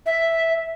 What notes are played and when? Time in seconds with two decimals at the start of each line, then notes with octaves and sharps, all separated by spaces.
0.06 E5